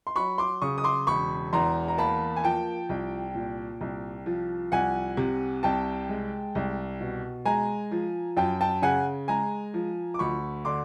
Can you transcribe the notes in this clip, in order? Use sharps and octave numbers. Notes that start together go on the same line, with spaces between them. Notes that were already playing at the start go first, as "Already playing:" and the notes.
C6
F#3 B5 C#6
C6 D6
C#3 C#6 D#6
D#6
C6 D6
E1 B5 C#6
E2 A#5 C6
A#5
A#3 A5 B5
G#5
F3 G5 A5
C2
A#2
C2
F3
C2 F#5 G#5
C3
C2 G5 A5
G#3
C2
B2
G#3 G#5 A#5
F3
F#2 G5 A5
G5 A5
C#3 F#5 G#5
G#3 G#5 A#5
F3
D6
D2 B5 C#6
D3 C6 D6